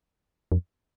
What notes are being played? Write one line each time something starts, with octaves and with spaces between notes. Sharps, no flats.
F2